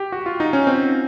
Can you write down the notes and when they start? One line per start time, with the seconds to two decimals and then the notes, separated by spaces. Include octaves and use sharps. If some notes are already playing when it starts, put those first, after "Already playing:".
Already playing: G4
0.12 F#4
0.26 F4
0.40 D#4
0.53 C#4
0.67 C4